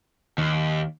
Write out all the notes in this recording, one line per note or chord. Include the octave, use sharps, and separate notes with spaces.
D#2 D#3